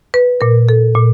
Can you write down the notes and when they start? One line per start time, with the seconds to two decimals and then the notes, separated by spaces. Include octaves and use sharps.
0.14 B4
0.41 A#2 A#4
0.69 A4
0.95 A#2